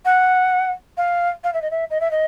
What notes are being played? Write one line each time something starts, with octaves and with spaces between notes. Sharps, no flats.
F#5
F5
F5
E5
D#5
E5
D#5
E5
D#5